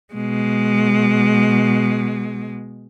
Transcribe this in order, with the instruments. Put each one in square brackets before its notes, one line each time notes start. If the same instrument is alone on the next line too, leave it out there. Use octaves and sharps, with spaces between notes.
[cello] B2 G#3